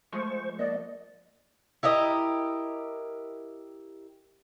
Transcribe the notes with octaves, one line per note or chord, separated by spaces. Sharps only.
F3 G#3 A3 C5 C#6
A#3 D5 D#5
E4 G4 A#4 D#5